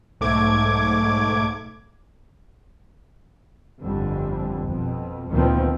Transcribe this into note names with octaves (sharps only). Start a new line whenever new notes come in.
B1 G#2 A3 D6 G#6
G1 F2 D3 G3
F2 B2
D2 A#2 D#3 F3 B3 C4